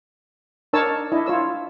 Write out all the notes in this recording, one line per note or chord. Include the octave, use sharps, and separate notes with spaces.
D4 D#4 A#4 C#5 A5 E6
D4 E4 D#5
F4 C#5 E6